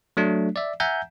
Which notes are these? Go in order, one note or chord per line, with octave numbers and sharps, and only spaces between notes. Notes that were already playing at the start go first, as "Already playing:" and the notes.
F#3 A3 D4
D5 E5
E5 F#5 G#5 A#5 G6